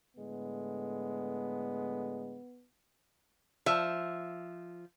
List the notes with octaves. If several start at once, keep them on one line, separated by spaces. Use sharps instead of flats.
A2 D3 G#3 B3
F3 E5